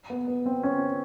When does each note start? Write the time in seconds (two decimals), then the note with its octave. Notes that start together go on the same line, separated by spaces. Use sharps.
0.10 B3
0.28 B3
0.46 C4
0.63 C#4